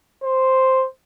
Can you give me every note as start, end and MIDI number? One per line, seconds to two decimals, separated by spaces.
0.24 0.86 72